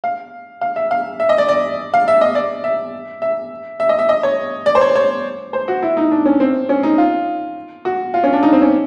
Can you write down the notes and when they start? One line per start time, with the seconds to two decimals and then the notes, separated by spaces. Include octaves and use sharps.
0.04 F5
0.61 F5
0.76 E5
0.91 F5
1.20 E5
1.29 D#5
1.38 D5
1.48 D5
1.94 F5
2.08 E5
2.21 D#5
2.35 D5
2.64 E5
3.22 E5
3.80 E5
3.89 D#5
3.99 E5
4.09 D#5
4.23 C#5
4.66 D5
4.75 C5
4.81 C#5
4.95 C#5
5.53 C5
5.68 F#4
5.82 E4
5.97 D#4
6.11 D4
6.25 C#4
6.40 C4
6.69 C#4
6.83 D#4
6.98 F4
7.85 F#4
8.14 F4
8.24 C#4
8.33 D4
8.43 D#4
8.52 C4
8.62 C#4